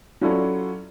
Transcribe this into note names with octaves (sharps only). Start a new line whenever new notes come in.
F#3 C#4 E4 F4 A4 D5